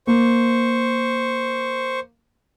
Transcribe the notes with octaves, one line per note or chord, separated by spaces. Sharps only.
A#3 C5 C#6